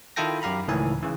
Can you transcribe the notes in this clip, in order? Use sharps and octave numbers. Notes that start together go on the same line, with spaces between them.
D#3 E4 F4 A4 G5 A#6
F#2 G4 F5 A#5 B5
C#2 A2 D#3 E3 G#5
C#3 E3